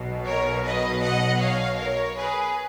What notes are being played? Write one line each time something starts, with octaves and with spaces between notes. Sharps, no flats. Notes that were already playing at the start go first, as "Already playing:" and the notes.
Already playing: B1 B2 F#3
A#4 C#5
B4 D#5
D#5 F#5
C#5 F5
A#4 C#5
G#4 B4